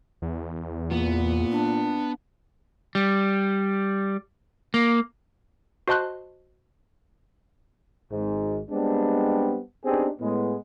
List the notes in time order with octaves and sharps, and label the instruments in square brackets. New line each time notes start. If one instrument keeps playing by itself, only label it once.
[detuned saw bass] E2
[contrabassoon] A#2 [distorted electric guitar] B3
[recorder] D4
[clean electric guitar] G3
A#3
[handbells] F#4 C5 D#5 A5 C6 F#6
[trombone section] G#1 G#2
G3 G#3 B3 C4 D4
B3 C4 D4 D#4 G4 G#4
A2 G#3 B3